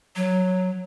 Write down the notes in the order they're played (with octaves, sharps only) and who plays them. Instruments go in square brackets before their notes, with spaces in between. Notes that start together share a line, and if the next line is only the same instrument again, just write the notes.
[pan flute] F#3